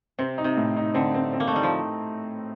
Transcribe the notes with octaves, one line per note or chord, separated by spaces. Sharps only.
C3 C4
D#4
C3
A2
D#4
D3 C4
C4
C4
A#3
A3
G3 D#4
F3